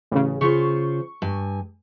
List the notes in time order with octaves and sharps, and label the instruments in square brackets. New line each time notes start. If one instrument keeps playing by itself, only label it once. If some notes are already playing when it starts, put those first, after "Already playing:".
[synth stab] A1 C#3
[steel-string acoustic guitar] C#3 F4 C5 [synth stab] C#6
[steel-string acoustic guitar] G2 G#5